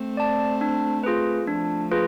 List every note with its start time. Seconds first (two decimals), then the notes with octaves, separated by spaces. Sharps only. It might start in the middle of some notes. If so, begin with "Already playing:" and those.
Already playing: A3 C4
0.17 D5 A5
0.61 D4
1.04 F4 G#4 B4
1.47 F3 A3 D4
1.91 F4 G#4 B4